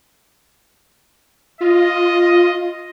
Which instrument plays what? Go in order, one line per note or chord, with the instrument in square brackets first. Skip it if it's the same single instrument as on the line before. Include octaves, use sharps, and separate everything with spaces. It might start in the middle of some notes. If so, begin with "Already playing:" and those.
[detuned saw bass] F4 [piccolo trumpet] D#5